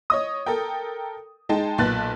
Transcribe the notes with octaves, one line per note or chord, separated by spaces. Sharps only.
C#5 D#5 D#6
A4 A#4 G5
G#3 D#4 G5 A5
B1 A#2 B4 A5 F#6 A6